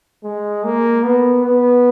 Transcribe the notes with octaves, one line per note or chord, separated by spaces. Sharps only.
G#3
A#3
B3
B3